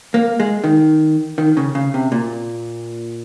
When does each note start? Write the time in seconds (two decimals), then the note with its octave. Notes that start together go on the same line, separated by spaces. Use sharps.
0.14 A#3
0.40 G#3
0.64 D#3
1.38 D#3
1.57 C#3
1.75 C#3
1.94 C3
2.12 A#2